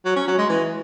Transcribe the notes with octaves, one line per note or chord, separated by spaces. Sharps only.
F#3
C#4
F#3
G#3
E3